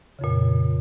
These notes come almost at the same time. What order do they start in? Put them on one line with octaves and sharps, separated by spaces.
C#3 F2 A#2